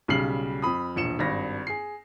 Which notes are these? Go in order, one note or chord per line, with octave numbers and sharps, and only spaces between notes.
B1 C#3 G3 F6 C7 F#7
F2 B5 D#6
E1 A#1 C#7 E7
G#1 G2 A#6
G#4 C7